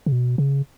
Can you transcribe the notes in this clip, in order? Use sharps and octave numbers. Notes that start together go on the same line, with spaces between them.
C#3
B2
C#3